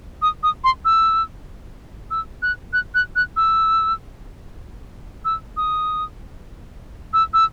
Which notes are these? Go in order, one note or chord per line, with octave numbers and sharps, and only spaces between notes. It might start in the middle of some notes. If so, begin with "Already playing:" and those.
D#6
D#6
C6
E6
E6
F#6
F#6
F#6
F#6
E6
E6
D#6
E6
E6